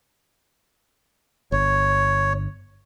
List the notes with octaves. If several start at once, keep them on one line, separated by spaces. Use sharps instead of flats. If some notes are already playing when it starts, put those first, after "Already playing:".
G1 C#5